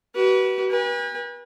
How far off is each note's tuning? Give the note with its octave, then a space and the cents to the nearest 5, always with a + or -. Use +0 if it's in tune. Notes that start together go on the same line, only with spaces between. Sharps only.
F#4 +40 B4 -20
B4 -35 G#5 -45